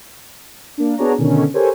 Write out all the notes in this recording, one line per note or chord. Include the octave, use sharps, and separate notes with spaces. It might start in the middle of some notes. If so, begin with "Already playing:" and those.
A#3 D4
B3 D4 F#4 G#4 C#5 A#5
B2 D3 D#3 C#4
G4 A4 A#4 C5 C#5 G#5